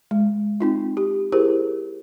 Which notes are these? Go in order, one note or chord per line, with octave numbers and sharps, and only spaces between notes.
G#3
C4 D#4 F4
G4
E4 G4 G#4 A#4 C5